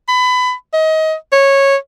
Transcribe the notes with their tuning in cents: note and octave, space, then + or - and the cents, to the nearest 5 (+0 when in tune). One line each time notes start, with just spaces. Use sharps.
B5 +25
D#5 +25
C#5 -10